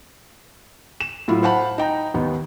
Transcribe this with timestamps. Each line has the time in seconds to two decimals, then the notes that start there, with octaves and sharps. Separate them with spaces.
1.01 E7
1.28 A2 F#3 E4 F4
1.43 C5 F5 F#5 A5 B5
1.78 D#4 G5 A#5
2.14 D#2 D#3 B3